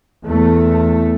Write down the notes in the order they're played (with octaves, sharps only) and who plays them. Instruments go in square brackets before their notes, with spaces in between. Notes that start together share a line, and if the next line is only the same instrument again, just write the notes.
[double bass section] E2 A3